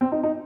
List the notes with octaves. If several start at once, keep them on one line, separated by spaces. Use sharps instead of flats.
C4
D#4
D#4